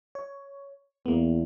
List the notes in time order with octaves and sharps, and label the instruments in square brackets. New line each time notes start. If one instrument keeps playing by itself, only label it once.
[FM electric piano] C#5
[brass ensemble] E2 [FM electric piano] A#3 B3